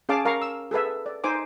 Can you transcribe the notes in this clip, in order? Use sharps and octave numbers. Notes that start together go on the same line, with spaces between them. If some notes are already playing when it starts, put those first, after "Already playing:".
C#4 G#4 F5 A5 D6
A#4 F5 A#5 C#6
E6
G#4 A4 B4 E5
D5
D#4 C5 G#5 D6